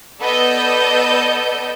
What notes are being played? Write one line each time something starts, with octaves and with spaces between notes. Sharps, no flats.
B3 A4 D5 D#5 G6